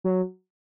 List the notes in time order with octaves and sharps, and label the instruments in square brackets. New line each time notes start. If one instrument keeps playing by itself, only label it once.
[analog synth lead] F#3